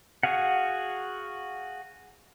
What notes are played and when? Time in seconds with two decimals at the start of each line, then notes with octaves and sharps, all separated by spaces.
0.23 F#4 G#4 F5 F#5